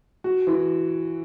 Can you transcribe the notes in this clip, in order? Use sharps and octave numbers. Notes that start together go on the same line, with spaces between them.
F#4
E3